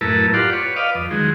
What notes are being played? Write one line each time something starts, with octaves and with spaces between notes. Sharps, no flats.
F#2 A2 E4 A#4 B4 A5
F4 G4 D5 F#5 C6
B4 C#5
B4 D5 D#5 F5
F2
D#3 F#3 G#3